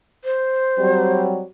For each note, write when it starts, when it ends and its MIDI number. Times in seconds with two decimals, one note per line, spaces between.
0.24 1.22 72
0.78 1.42 54
0.78 1.42 55
0.78 1.42 60